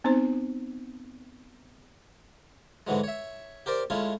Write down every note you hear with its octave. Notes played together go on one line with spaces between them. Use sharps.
B3 C4 D#4 C5
G#2 D3 E3 F#3 G#3
C#5 E5
G4 A#4 C5 D5
G#3 A3 C#4 E4 F4